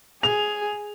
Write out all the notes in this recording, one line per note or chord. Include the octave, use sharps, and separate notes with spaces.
G#4 F7